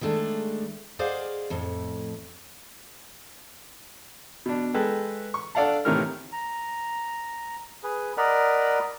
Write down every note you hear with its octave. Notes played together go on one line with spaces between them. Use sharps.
D#3 G#3 A3 D4
G#4 C5 D5 D#5 F5 F#5
F2 A2
B2 D4
G#3 A4 B4 G5
C#6
D4 A4 D5 F5 F#5 A5
A2 C3 D#3 E3 A#4 F6
A#5
G#4 B4
A#4 D5 D#5 F#5 B5 F6